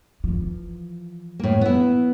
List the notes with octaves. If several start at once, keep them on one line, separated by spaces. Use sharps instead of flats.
E3 F3
A2 A#3
B3 E4